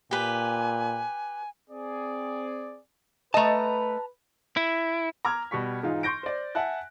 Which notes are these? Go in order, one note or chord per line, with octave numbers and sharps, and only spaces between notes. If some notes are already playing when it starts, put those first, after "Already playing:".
A#2 G4 B4 G#5
C4 G#4 D5
A3 B4 D#5 A5 A#5
E4
A#5 D6 E6 F6 G#6
B2 G3 C#6 B6
G#2 E3 D#4 F4
C6 C#6 G6 A#6 D7
C5 D5
E5 F#5 G#5 A5 F#6